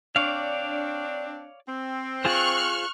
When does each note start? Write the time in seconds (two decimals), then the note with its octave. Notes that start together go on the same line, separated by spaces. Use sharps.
0.16 C4 D4 C#5 D5 F5
1.68 C4
2.25 F4 G#4 C5 C#6 F6 F#6